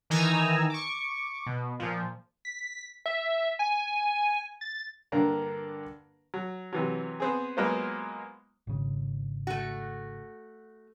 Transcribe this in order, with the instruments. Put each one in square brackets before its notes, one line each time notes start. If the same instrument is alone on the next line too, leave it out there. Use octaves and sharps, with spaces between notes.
[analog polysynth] D#3 E3 D#4 G#5 A#5 E6
C#6 D6
B2
A#2 F3
[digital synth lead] B6
E5
G#5
A6
[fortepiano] G2 D3 A#3 D4 F5 A#5
F#3
C3 E3 F#3
B3 C4 G#4
F#3 G#3 A#3 B3 F4 C5
[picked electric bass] G#1 C#3
[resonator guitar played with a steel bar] A3 F#4